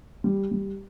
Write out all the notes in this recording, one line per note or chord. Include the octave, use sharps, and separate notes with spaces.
G3
G3